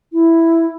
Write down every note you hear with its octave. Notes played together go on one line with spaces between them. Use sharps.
E4